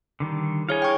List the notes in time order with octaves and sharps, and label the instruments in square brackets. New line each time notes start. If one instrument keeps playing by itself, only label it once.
[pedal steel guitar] D3 D#3 G3
[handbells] E4 G#4 C#5 [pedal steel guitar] F5 G#5
[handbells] G5 C#6